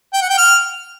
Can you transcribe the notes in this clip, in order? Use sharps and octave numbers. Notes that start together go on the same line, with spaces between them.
G5
F#5
G5
F6